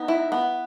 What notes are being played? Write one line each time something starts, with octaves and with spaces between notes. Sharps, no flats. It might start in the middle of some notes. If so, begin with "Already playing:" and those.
Already playing: B3 D#4
E4
B3